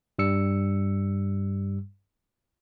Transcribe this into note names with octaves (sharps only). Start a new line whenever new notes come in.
G2 G3 E6 C#7